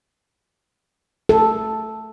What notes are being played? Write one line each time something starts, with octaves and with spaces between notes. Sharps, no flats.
A4